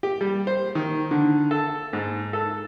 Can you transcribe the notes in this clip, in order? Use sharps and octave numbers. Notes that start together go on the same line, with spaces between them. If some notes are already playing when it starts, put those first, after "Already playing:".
G4
G3
C5
D#3
D3
A4
G#2
A4